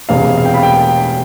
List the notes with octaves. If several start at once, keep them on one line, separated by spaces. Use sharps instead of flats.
E1 E2 C3 F5
F5
G5
B5
G5